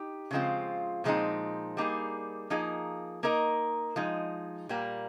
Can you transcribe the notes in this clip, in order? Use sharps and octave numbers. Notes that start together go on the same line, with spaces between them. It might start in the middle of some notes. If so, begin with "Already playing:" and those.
Already playing: D#4 G4
C#3 F3 G#3 C4 F4
A#2 F3 G#3 C4 D#4
G3 A#3 D#4 G#4
F3 A#3 D#4 G#4 D#5
A#3 D#4 A#4 D#5
F3 G#3 D#4
A#2 G3 A#3